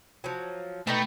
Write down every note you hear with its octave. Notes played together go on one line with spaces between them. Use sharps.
F3 F#3
B2 A3 D#4 G5